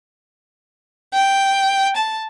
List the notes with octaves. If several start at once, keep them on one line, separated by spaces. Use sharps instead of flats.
G5
A5